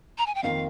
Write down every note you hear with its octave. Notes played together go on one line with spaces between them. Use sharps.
A#5
G#5
G5
F2 D#3 A#3 F4 A#4 F5